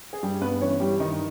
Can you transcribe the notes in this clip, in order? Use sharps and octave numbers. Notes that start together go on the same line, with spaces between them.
G#4
G2 G3 G4
G2 B3 B4
E3 C#4 C#5
E3 G3 G4
G2 D#3 D#4